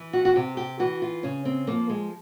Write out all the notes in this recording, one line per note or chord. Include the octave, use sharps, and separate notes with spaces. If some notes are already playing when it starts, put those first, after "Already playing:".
Already playing: E3
F#4
F#4
C3 G4
G4
E3 F#4
F4
C#3 C#4
C4
F3 A#3
G#3